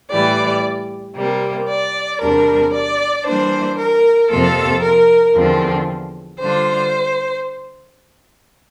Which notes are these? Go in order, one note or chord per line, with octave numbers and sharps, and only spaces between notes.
A2 E3 G3 D5
C3 G3 A#3
D5
E2 C3 G3 D4 A#4
D5
E3 G3 A#3 D4 C5
A#4
F2 C3 F3 A#3 F4 A4
A#4
E2 D3 F3 C4 F4
D3 G3 D4 F4 C5